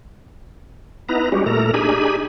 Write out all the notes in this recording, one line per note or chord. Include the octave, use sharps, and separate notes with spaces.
B3 D#4 E4 B4 A#5
G3 G#3 C#4 F#4 G4
A#2 A3 A4 A#4 A#5
D4 D#4 G4 G#4 G#5 B5